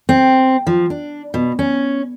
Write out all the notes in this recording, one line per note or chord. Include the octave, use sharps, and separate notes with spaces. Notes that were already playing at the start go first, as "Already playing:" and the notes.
C4
F3
D4
B2
C#4